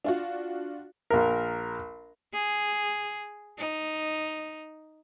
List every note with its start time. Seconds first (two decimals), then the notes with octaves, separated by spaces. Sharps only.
0.04 D4 F4 F#4
1.10 A#1 A#4
2.34 G#4
3.59 D#4